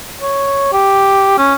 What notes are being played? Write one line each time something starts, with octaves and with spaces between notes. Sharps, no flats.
C#5
G4
C#4